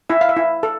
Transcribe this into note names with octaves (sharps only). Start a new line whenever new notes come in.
E4 E5
F5
E5
E4
A4